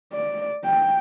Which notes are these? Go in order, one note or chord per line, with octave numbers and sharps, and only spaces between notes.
D5
G5